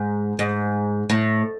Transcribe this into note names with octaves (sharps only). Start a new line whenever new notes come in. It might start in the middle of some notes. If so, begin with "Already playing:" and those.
Already playing: G#2
G#2
A2